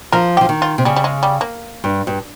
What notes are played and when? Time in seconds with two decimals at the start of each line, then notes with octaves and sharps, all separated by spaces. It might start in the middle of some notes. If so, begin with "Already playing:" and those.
0.12 F3 A#4
0.37 F3 G4
0.49 D#3
0.62 F4
0.78 C3
0.85 C#3 G3
0.96 G3
1.04 G#3
1.23 G3
1.41 A#3
1.84 G2
2.07 G2